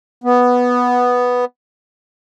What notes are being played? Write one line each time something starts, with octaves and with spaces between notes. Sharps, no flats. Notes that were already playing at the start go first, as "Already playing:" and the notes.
B3